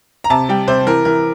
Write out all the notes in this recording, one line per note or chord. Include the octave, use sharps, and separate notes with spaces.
A#5
C3 A5
G3 G5
C3 C5
E3 A#4
E3 A#4